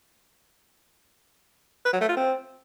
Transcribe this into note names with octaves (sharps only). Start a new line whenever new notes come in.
B4
F#3
A3
F4
C4